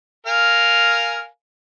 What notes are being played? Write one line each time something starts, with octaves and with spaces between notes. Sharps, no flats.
A#4 F5 G#5